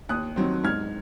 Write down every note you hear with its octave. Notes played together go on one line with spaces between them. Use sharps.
D#2 D#6 F#6
D#3 F#3 C4
G#2 F6 G#6